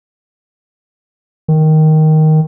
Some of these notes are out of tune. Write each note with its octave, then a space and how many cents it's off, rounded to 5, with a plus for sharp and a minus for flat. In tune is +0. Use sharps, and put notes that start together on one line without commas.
D#3 +5